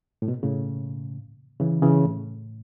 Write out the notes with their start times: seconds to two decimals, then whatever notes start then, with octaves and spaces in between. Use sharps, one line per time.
0.22 A2
0.28 B2
0.43 A2 C#3
1.60 C#3 E3
1.82 C#3 E3
2.05 A2